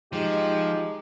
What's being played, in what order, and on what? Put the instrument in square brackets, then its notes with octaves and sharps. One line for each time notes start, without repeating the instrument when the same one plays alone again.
[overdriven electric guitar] F3 [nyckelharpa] G#3 [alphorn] D#4 [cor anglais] G4